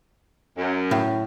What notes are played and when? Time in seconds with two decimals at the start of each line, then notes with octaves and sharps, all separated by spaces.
0.58 F#2
0.91 A2